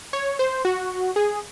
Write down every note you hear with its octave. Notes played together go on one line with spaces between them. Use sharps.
C#5
C5
F#4
G#4